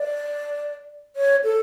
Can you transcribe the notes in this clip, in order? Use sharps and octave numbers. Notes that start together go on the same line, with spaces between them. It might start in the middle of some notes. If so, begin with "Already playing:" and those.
Already playing: D5
C#5
A4